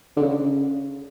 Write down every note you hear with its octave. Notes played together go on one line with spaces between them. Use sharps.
D3
C#3